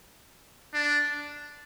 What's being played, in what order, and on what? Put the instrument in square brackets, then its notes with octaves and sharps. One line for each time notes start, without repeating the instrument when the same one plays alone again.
[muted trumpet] D4